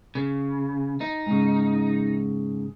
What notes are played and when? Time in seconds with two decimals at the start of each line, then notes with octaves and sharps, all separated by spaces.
0.15 C#3
1.01 D#4
1.27 G#2 C#3